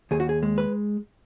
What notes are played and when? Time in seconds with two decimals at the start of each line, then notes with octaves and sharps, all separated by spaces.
0.11 D#2 G#4
0.20 F#4
0.29 G#4
0.43 G#3
0.58 B4